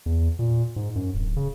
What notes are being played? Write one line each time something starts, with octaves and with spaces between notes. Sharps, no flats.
E2
A#2
G#2
F#2
D1
C#3